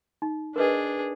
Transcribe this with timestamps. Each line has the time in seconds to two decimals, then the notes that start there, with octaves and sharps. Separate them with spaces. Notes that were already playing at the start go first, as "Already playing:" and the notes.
0.22 D#4
0.56 D4 G#4 A#4 B4 D#5